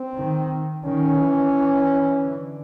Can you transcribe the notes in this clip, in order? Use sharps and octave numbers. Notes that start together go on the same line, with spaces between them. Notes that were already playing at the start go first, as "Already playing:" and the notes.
Already playing: C4
D#3
D#3 C#4
E3
D3